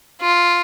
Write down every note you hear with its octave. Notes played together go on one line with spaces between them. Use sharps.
F4